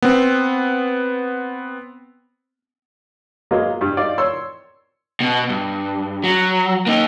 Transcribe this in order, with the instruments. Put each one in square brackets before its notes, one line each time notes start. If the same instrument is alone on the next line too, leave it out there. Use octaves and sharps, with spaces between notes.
[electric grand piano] B3 C4
[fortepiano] F#3 G#3 A#3 B3 F4
G2
D#4 F4 D5
C#5 C6 E6
[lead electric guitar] B2
G2
F#3
A#3 D#4